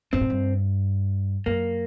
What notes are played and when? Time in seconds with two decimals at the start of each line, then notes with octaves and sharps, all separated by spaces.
0.13 G2 C4
0.21 A2
0.30 G2
1.46 F#2 A#3